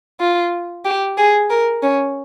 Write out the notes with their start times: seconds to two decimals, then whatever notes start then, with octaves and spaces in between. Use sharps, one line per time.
0.20 F4
0.85 G4
1.18 G#4
1.50 A#4
1.82 C#4